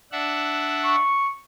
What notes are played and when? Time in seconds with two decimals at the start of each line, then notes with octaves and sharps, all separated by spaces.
0.12 D4 E5 F#5
0.84 C#6